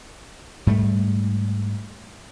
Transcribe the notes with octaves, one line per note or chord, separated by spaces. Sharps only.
G#2 G3 A3